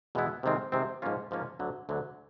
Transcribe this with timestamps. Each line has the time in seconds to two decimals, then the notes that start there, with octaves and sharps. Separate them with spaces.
0.15 E2 B2 G#3 B3 E4
0.43 C3 D#3 G#3 C4
0.72 C3 D#3 G#3 C4
1.02 G#2 F3 A#3 C#4 F4
1.31 G#2 F3 A#3 C#4 F4
1.59 D2 D3 F#3
1.89 D2 D3 F#3